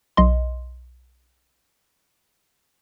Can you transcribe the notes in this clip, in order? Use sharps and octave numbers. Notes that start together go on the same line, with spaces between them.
B1 D#5 C6